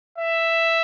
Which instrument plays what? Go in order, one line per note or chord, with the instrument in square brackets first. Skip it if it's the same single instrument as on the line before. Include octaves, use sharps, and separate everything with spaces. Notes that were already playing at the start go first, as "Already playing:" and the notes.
[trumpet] E5